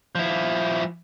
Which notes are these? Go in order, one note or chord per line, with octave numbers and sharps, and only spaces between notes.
F3 E4